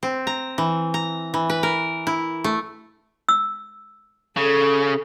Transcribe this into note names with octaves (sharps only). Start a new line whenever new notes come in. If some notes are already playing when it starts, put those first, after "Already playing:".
C4
A#5
E3
A#5
E3
B4
A#4
E4
A3
E6
C#3 A4